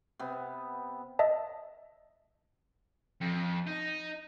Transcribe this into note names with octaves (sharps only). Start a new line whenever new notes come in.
C3 B3
D#5 E5 A5
F2
D#4